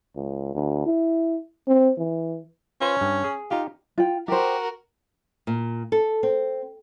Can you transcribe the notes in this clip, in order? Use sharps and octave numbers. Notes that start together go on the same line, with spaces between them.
C#2
D2
E4
C4
E3
C#4 F4 B4 C5
G2
G#4
D#4 F4 G4
F4 G5
F#4 G4 A#4 C5
A#2
A4
C4